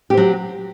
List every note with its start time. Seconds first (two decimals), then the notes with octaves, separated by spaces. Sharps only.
0.10 G4
0.14 C4
0.17 F#3